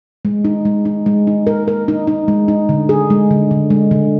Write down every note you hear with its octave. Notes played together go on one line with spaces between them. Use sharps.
G#3
D#4
G#3
D#4
G#3
D#4
A#4
A#4
D#4
D#4
G#3
D#4
D3
G#4
G#3
D3
D3
G#3
D3